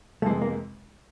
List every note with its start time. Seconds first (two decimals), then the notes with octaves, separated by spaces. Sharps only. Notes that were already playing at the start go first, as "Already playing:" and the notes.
0.22 F2 C3 E3 G#3 A3
0.41 A#3